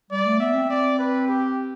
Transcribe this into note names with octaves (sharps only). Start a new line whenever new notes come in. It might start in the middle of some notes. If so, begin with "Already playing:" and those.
G3 D5
A3
B3 E5
C4
D5
B4
G4